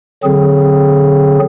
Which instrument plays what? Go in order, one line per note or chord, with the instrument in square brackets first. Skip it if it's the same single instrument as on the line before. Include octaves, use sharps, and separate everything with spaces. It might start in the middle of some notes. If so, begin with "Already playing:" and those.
[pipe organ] D3 F#3 C4 G#4